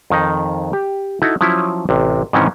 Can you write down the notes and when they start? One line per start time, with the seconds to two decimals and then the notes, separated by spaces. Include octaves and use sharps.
0.10 F2 D#3 D#4
0.73 G4
1.22 D#4 E4 F#4 A4
1.41 F3 F#3 C#4 E4
1.89 A1 C3
2.33 G#2 C3 D#3 E3 C4 C#4